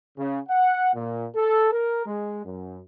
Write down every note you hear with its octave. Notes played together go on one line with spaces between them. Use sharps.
C#3
F#5
A#2
A4
A#4
G#3
F#2